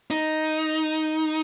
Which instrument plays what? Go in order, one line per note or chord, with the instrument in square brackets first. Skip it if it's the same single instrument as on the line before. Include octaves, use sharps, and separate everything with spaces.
[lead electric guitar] D#4